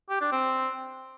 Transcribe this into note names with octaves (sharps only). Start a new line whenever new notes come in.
G4
D4
C4